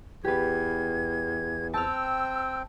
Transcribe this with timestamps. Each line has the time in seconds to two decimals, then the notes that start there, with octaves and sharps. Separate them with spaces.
0.24 E2 G4 B4 G#6
1.74 C4 G5 A5 E6 F6